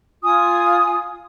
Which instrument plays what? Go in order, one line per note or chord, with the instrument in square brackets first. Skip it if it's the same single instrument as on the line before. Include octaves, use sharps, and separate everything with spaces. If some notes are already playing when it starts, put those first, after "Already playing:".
[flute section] F4 G#5 D#6